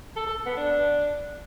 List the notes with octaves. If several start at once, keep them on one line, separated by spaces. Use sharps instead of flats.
A4
A4
B3
D4